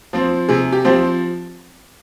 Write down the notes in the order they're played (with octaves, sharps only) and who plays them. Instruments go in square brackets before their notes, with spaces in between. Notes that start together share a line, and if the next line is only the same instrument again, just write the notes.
[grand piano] F3 C4
C3 G#4
G4
F3 C4 G4